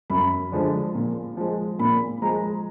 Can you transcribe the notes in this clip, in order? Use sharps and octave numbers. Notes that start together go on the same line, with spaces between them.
F#2 B5
D3 F3 G#3
A#2
F3 G#3
A#2 B5
F3 G#3 A#5